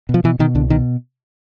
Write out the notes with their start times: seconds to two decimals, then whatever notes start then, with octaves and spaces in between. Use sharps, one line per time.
0.09 B2
0.14 F3
0.24 B2 E3
0.39 B2 D#3
0.55 C2 D3
0.70 B2 D#3